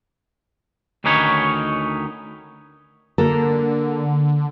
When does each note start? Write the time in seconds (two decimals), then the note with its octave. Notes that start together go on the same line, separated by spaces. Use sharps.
1.04 D2 D#3 C#4 D#4 B4 C#5
3.18 D3 A#3 A4 A#4